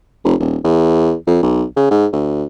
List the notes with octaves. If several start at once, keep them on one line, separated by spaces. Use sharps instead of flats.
F1
D#1
E2
F2
B1
C#3
G#2
D2